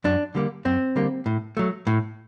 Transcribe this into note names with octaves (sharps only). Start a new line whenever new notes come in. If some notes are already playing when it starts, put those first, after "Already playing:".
F#2 D4
D3 G3 A#3
F#2 C4
D3 G3 A#3
A2
F#3 A3
A2